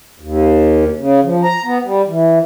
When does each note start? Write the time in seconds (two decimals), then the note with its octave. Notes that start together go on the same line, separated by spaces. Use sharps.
0.20 D#2
0.98 C#3
1.24 F3
1.43 A#5
1.64 B3
1.84 G3
2.07 E3